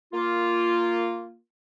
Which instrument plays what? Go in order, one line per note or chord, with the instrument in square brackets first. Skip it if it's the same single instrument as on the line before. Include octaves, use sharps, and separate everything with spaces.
[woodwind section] A#3 F4